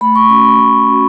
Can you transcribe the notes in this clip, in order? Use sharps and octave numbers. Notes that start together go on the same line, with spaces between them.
A3 B5
C#6
C#4 F#4 C#6
B5
A3
C#4 F#4